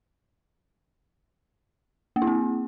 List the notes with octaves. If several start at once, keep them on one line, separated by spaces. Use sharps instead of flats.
A#3
E4
C4